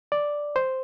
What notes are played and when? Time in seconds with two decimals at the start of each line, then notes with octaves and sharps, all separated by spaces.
0.12 D5
0.56 C5